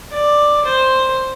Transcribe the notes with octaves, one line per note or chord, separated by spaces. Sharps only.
D5
C5